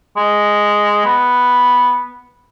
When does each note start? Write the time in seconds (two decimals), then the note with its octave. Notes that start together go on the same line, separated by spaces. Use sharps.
0.17 G#3
1.05 B3